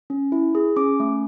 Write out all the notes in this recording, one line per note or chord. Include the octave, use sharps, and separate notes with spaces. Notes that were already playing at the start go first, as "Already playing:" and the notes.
C#4
E4
G#4
C#4 D6
A3